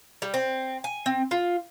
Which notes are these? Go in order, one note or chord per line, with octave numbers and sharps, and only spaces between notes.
G3
C4
G#5
C4
F4